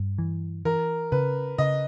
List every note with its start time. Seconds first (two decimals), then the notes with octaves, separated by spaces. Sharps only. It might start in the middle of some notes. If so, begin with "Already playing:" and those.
Already playing: G2
0.18 E3
0.65 E3 A#4
1.12 C#3 B4
1.58 C#3 D#5